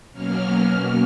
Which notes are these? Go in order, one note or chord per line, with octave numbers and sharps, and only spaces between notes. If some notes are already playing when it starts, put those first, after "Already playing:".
B2 F#3 A#3 C#4 F6